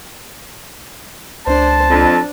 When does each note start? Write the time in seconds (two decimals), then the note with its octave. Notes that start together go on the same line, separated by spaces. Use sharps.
1.47 C#2 D4 C5 A5
1.91 F2 D4